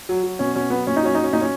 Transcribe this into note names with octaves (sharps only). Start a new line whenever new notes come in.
F#3
F#3
B2 C#4
B2 C#4
F#3 B3
A#2 C#4
D#4
F#3 C#4
F#3 D#4
C#4
A#2 D#4
C#4